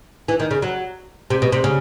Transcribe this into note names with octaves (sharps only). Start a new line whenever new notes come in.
E3
D#3
C#3
F#3
C3
B2
C3
C#3